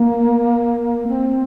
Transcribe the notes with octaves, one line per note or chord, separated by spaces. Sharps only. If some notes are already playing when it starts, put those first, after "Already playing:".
Already playing: A#3
C4